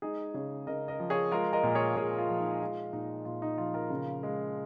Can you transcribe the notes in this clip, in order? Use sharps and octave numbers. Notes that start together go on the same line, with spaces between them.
G#3 D#4 G#4
C#3 G#4 C#5
C#3 A#4 D#5
A#4 D#5
F3
G#4 C#5
G#3 F4 A#4
A#4 D#5
A#2
G#4 C#5
A#2 G#4 C#5
F4
F3
D#4
G#3 F4
A#2 D#4
A#2 F4
D#4
F3 F4
F4 A#4
C#3
G#3